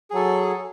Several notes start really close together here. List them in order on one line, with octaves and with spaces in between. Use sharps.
G#4 F#3 A4